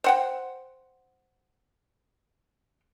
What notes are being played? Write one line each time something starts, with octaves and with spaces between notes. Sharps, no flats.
C5 F#5 G5